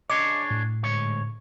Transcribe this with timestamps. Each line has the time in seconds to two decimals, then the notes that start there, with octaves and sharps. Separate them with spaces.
0.10 D4 G#4 C#5 D#5 D6
0.51 A2
0.83 D2 G#2 C#5